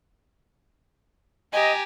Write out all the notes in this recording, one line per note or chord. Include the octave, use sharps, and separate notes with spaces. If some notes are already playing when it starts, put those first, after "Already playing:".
G4 D#5 G#5 A#5